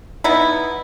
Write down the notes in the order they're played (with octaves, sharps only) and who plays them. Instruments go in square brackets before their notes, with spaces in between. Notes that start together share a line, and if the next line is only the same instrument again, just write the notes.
[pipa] B3 D#4 E4